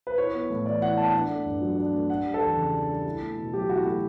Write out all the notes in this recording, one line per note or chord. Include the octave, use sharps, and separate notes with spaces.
B4
E4 C#5
B3
A2
E3 D5
E4 F#5
B3 A5
D4 F#5
A3
G2
F#3
D4
A3
D4 F#5
G3
A4
E2
C#3
D4
G3
E4
A3
B2
F#3 G4
E4 F#4
A3 F#4